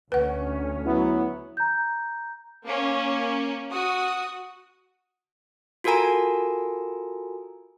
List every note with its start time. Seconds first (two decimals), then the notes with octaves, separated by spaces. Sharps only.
0.12 D2 C#4 B4 F#5
0.85 F#3 B3 E4
1.57 A#5 G6
2.65 A#3 C#4
3.71 F#4 D#6
5.84 F4 F#4 A4 A#4 G#5 A#5